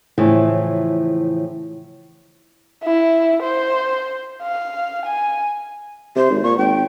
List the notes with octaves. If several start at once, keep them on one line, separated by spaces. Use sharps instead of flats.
A2 C#3 E3 F3 C5 E5
E4
C5
F5
G#5
C3 C5
G#1
A#2 C#6
G#1 G5